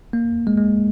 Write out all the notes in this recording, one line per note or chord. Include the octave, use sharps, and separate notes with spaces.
A#3
G#3
G#3